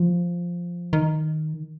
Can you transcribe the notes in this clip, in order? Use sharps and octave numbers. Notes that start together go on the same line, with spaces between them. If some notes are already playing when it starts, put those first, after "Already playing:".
Already playing: F3
D#3